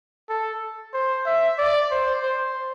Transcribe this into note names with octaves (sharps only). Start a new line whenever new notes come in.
A4
C5
E5
D5
C5
C5